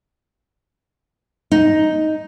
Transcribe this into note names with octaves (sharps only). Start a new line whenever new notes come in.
D#4